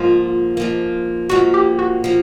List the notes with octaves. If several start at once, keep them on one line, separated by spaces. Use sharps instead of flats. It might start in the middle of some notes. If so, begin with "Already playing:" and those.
Already playing: G#2 F3 A#3 F4
G#2 F3 A#3
G#2 F3 A#3 F#4
G4
F#4
F3 A#3